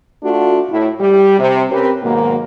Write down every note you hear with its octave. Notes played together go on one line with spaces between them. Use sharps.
A3 D4 F4 F#4
A2 E4
G3 G4
C3
C4 C#4 G4 A#4 B4
G#2 B2 D#3 F#3 A#3